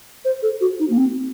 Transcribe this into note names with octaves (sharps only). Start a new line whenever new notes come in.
C5
A4
F#4
D#4
A#3
C4